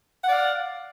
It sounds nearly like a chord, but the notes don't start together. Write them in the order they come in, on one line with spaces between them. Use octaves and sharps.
F#5 D5 F5